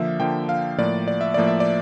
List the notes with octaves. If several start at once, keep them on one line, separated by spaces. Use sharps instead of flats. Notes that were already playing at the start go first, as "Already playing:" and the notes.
Already playing: D3 F3 A#3 E5
D3 F3 A#3 G5
F5
A2 F3 A#3 D5
D5
E5
A2 F3 A#3 D5
E5
D5